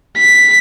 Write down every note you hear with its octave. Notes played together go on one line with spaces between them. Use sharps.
B6